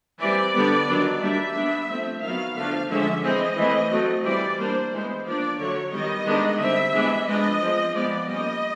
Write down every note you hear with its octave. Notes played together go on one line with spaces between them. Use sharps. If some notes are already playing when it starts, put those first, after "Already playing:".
E3 G3 C4 D5
D3 G3 B3
D#3 F#3 B3 D4
G3 A#3 D4 E5
G3 B3 D4
F3 A3 C4
D#3 F#3 B3 F5
D3 F3 A3 D4 F5
D3 F3 G#3 C#4 E5
E3 G#3 C4 D#5
E3 A3 C4
F#3 A3 C4
E3 G3 C4 D5
G3 A#3 D4 C5
E3 G#3 B3 C5
F3 A#3 D4 D5
D3 F#3 A3 C#5
D#3 G3 B3 D#5
D#3 G#3 B3 D4
D3 G3 C4 E5
E3 G#3 B3 D4
F3 G#3 B3 D4 D#5
F3 G#3 C4
F3 G#3 B3 D5
G3 A#3 C#4 D#5